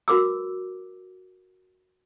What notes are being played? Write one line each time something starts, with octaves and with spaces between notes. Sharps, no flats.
F#4 A#4 B4 D6 E6